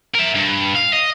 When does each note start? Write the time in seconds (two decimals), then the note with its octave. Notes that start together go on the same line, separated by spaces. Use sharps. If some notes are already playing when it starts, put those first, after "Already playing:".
0.15 A#4 E5
0.36 G2
0.76 F5
0.93 D#5